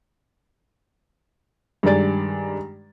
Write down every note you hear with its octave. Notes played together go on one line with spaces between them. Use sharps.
G2 D#3 G#3 D5 A6